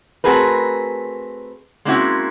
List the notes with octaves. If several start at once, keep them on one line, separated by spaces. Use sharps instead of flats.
A3 C4 F#4 G#4 A#4 B4
G#3 A#3 C4 C#4 E4 F#4